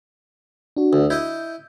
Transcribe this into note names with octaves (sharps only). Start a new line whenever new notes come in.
D4 F#4
D2
E4 D#5 G6